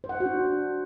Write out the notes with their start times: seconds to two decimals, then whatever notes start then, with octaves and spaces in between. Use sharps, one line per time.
0.04 C5
0.09 F#5
0.15 C5
0.20 F#4
0.26 D4